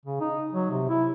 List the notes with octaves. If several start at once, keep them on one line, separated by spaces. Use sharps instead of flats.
C#3
D#4
F#3
C3
E4